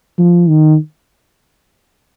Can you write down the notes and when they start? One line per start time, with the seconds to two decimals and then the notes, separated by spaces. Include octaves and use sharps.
0.18 F3
0.49 D#3